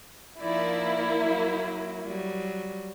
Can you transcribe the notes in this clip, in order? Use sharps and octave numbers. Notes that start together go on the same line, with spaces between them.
F3 A#3 D#4 E4 D5
F#3
F#3 G3